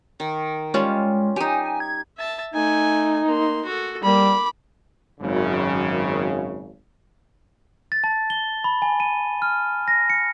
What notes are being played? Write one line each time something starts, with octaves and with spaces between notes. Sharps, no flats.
D#3
G3 G#3 C#4 F4
D#4 G4 G#5
G#6
E5 A5
A3 D#4 G#5
A#3 C6
F#4 A4
G3 A#3 B5 D6
G#1 F#2 C#3
A6
A5
G7
B5
G#5
D#7
F6
A#6
C#7